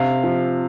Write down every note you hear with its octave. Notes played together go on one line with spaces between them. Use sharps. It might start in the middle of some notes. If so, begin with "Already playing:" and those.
Already playing: C3 F5
F3